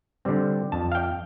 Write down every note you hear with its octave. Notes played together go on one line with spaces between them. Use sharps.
D3 G3 C4
F2 A5
F5
G5